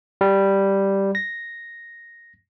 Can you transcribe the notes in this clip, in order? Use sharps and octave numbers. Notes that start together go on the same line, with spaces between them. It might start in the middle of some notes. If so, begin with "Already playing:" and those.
G3
A#6